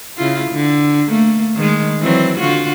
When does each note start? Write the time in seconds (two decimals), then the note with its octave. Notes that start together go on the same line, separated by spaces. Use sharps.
0.17 C#3 E4 F4
0.52 D3
1.08 A3 A#3
1.55 D#3 G#3
2.00 E3 F#3 C4
2.40 D3 F4 F#4